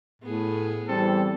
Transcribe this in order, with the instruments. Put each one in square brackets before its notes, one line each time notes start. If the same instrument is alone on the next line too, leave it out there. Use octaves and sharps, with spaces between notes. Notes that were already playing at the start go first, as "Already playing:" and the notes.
[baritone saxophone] A2 [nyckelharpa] B3 G#4
[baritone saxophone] E3 [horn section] G3 C4 A4